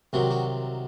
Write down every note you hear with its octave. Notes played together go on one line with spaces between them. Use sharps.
C2 C3 D#3 F#3 F#4
F#4